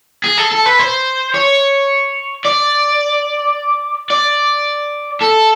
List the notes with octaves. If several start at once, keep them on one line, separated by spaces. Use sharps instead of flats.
G#4
A4
A4
B4
C5
C#5
D5
D5
A4